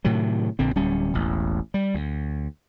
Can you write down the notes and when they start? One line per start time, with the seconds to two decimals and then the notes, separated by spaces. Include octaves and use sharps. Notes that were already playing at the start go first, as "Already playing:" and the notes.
0.05 A2 C3 D#3 F#3
0.59 A#1 D3 C4
0.76 D1 G3 C#4
1.14 E1 A1
1.74 G3
1.94 D2